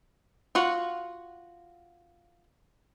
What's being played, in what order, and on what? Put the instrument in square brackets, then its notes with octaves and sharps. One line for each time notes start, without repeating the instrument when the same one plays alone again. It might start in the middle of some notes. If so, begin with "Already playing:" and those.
[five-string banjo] F4 F#4 F#5